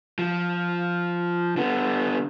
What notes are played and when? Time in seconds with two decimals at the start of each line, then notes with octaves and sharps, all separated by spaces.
0.19 F3
1.57 D3 B3